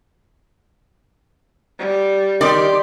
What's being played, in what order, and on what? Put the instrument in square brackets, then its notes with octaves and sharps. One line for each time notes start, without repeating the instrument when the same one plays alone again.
[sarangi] G3
[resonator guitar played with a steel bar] D#3 [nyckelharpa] G4 C6 [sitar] D5